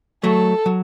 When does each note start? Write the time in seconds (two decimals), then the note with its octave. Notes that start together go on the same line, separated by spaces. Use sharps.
0.23 F#3 A3 A4
0.66 F#3